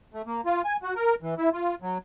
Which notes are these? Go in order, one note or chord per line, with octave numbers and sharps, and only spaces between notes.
A3
A#3
F4
G#5
F#4
A#4
E3
E4
F4
F#3